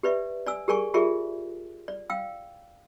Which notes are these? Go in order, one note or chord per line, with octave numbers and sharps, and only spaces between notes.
G4 B4 D5 E5
D5 G#5 E6
G4 G#4 A#4 D5 G#5 C#6
F4 G4 G#4 A#4 D5 E5
D5
F5 G5 E6